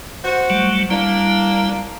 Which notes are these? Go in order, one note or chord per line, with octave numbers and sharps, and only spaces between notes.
F#4 C5
F#3 G3 A3
G3 A#3 D4 E4